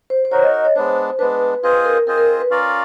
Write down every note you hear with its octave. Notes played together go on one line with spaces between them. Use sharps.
C5
C5
D#4 F#4 A#4 C#5
D#5
D#5
C#5
G#3 B3 D4 C5
G#3 B3 D4 B4
C4 F4 G#4 B4 C5 D#5
A#4
C4 F4 G#4 A#4 C5 D#5
A#4
B4
C#4 F4 A#4 D5 F5